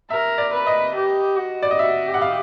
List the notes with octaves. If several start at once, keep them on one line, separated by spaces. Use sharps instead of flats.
A#4 E5
D5
B4
D#5
G4
F#4
D5
D#5
F#4 E5
G4
F#5
F5